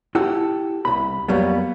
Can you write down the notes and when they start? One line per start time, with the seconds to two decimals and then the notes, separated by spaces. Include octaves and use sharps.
0.15 E4 F#4 G4 A4 F#5
0.85 C2 B5
1.28 F2 F#3 G3 A#3 B3